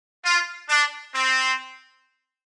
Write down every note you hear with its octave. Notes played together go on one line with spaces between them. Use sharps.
F4
D4
C4